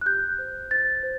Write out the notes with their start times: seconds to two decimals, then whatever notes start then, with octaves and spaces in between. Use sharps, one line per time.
0.01 F#6
0.06 G4 G6
0.39 C5
0.71 C5 A6
1.03 C5